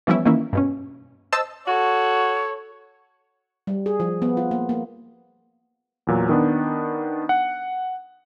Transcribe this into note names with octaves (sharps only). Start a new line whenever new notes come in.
E3 F3 G3 B3 C#4 E4
D#3 E3 A#3 C#4 E4
G2 B2 C#4
C5 D#5 A5 E6
F#4 A4 C#5
G3
G#4
F3
B3
F4
A#3
A#3
E2 A#2 F#3
D#3 B3 D4
F#5